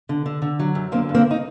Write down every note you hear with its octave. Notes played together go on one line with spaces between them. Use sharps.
D3
D3
D3
F#3
F#2
D3 A#3 C4
G2
A#3 C4
D#4